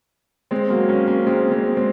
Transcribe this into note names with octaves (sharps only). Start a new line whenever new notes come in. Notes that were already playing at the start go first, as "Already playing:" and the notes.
G#3 C4
F#3 A#3
A#3 C#4
A#3 C#4
G#3 C4
G#3 C4
G#3 C4